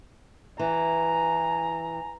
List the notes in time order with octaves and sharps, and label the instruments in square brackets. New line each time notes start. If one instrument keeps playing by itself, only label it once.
[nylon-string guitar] E3 [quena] G#5 [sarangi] A#5